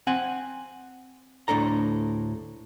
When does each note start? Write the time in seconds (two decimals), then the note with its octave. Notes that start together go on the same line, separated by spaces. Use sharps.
0.07 C4 F#5 G#5
1.48 D2 A2 D4 A4 A#5